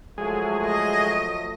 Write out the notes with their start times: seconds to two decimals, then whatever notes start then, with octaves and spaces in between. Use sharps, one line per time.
0.18 F3 F#3 G#3 A3 G#4
0.66 D#5